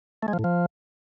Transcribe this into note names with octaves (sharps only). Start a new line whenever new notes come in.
A3
G#3
F3
A2
F3